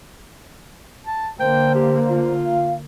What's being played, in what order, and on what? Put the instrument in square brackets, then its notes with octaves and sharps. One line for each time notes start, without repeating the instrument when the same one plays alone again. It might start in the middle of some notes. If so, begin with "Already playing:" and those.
[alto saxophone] A5
[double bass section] D3 A#3 [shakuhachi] C5 [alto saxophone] G5
[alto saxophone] G4
F4
[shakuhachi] F5